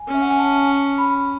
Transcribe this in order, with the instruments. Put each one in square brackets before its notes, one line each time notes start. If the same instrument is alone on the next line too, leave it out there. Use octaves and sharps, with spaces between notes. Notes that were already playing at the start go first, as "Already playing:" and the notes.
Already playing: [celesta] G#5
[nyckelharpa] C#4
[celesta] E5
F#5
G#5
A5
B5